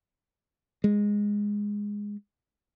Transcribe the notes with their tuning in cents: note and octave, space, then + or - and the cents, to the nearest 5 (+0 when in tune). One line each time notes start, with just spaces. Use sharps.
G#3 -10